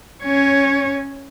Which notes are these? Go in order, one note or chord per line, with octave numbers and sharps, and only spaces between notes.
C#4 C#5